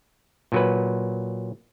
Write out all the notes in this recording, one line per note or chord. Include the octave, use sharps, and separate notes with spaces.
A#2 F#3 B4